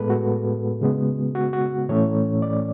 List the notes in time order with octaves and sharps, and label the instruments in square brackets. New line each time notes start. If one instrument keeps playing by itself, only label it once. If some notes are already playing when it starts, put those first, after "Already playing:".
Already playing: [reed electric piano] A2 G#3 B3 A4 B4
F#4
C#3 G#3 B3
F#4
F#4
A2 E3 A3 C#4 C#5
D5